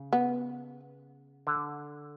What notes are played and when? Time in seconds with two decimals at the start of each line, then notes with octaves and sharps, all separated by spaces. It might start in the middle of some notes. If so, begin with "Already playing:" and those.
Already playing: C#3
0.13 B3
1.47 D3